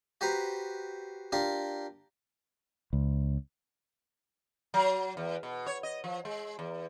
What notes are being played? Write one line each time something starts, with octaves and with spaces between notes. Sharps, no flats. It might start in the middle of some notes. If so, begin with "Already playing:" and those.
F#4 G4 B4 C5 A#5
D4 F4 G4 A#4
C#2
F#3
E2
B2
C#5
D#5
F3
G#3
E2